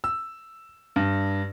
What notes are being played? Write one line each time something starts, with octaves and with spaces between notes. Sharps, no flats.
E6
G2